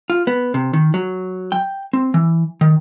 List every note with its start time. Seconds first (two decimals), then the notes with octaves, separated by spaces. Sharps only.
0.10 F4
0.27 B3
0.54 C3
0.73 D#3
0.94 F#3
1.52 G5
1.93 C4
2.14 E3
2.61 D#3